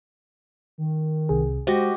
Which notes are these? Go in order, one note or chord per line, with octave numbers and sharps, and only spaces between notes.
D#3
C2 C3 G#4
G#3 F#4 G4 C5 D#5